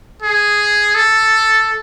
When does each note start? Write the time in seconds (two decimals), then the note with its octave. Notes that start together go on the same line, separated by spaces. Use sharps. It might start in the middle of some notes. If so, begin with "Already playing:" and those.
0.22 G#4
0.95 A4